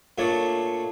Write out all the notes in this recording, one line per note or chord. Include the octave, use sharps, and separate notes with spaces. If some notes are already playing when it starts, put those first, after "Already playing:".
A#2 A3 D4 C#5 D5